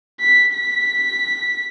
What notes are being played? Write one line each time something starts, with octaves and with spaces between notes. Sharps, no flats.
B6
B6